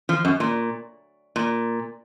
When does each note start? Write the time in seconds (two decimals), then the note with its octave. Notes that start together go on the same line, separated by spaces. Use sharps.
0.09 F3
0.25 F#2
0.40 A#2
1.36 A#2